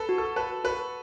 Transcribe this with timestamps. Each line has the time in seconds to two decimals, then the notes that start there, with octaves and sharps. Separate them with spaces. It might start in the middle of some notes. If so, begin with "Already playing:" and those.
Already playing: A4 B4
0.09 F#4
0.18 A4
0.36 B4 A5
0.64 F#4 B4